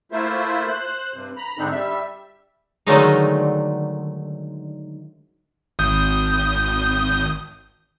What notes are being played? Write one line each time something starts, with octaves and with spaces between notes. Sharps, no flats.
A3 A#3 E4 F4 C5 E5
C5 F#6
G2 C3
A#5 B5
G#2 D3 C4 D4 D#4
G3 E5
D3 D#3 F#3 G#3 A3 D#4
G#1 D#6 G6